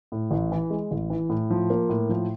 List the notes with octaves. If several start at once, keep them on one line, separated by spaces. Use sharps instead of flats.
A2
A1
E3
G#3
A1
E3
A2
F3
A#3
A2
F3